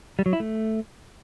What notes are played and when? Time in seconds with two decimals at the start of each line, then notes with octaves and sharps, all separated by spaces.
0.19 G3
0.26 F#3
0.33 E4
0.40 A3